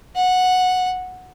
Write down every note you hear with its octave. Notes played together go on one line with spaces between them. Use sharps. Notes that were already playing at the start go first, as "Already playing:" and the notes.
F#5